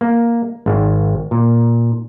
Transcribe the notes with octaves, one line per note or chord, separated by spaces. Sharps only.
A#3
G#1
A#2